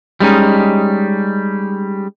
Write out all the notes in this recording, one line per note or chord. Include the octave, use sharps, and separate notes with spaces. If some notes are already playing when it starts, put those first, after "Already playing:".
G3 G#3 C#4 D#4